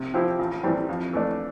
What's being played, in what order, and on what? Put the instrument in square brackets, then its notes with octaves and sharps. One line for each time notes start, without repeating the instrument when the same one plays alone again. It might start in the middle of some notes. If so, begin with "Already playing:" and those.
Already playing: [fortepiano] C3
F3 C4 E4 G4
[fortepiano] A1 [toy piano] F4
[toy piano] F4
[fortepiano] A2 E3 G3 C4 [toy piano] E4
[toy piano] E4
[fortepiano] F2
E3 A3 D4